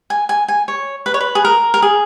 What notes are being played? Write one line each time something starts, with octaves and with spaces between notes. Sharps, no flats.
G#5
G#5
G#5
C#5
B4
C#5
B4
G#4
A#4
A#4
G#4